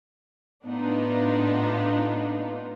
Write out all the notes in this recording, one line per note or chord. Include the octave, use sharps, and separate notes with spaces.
A2 B3 D4 D#4 F4